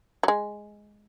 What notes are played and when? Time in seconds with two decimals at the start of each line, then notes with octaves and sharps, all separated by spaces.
0.23 F#3
0.28 G#3